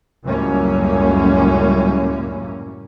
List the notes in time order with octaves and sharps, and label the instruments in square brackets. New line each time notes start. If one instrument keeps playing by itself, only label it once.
[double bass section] C#2 F#2 A2 G3 A#3 C#4